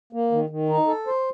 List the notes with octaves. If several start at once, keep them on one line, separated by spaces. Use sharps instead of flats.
A#3
D#3
D#3
D#4
A4
C5